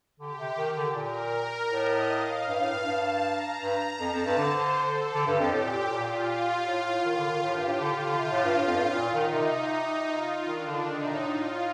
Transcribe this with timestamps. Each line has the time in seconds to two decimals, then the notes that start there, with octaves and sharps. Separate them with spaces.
0.19 D3 G4
0.38 C3
0.57 D#3
0.77 D3
0.95 A#2 A#4
1.72 A2 D#5
2.10 F5
2.47 G2 F5
2.61 A2
2.73 G2
2.86 G2 A5
3.24 A#5
3.61 G2 A#5
4.00 F2 A5
4.13 F2
4.25 G2
4.38 D3 C5
4.76 A4
5.14 D3 G4
5.27 G2
5.39 F2
5.52 A2 G4
5.65 A#2
5.78 A#2
5.90 A#2 F4
6.66 A2
6.85 A2
7.04 D#3 F4
7.17 D3
7.30 D#3
7.42 A2 G4
7.55 G2
7.68 A2
7.80 D3 F4
8.06 D3
8.18 C3
8.31 A2
8.44 G2
8.57 A2
8.66 F2
8.76 G2
8.85 A2
8.94 A#2 D#4
9.14 D#3
9.33 C3
9.51 C3
10.08 F4
10.46 D#3 D4
10.66 D3
10.85 D#3 D#4
10.94 D3
11.03 C3
11.13 A2
11.23 F4